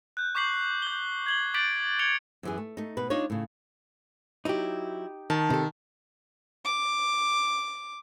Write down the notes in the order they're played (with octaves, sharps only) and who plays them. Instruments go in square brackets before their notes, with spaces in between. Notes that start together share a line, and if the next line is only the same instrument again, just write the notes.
[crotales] F#6 G6
C#6 D6 G6 B6 C7 F#7
G6 G7
G#6 F#7 G7
D6 G6 A6 B6 D7 F#7
G#6 C#7 F7 G7
[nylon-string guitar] F#2 E3 G#4
A3
A3 D#4
B2 B4
D4 D#4 F4 C#5
A2 C#3
[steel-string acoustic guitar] F#3 E4 [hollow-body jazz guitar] D#4 G4
[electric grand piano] D#3 [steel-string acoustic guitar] A5
[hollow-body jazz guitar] C3 A4
[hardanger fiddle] D6